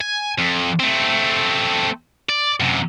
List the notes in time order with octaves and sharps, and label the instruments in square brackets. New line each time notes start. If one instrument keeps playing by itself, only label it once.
[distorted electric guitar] G#5
F2
A3 C4
D5
F#2 C3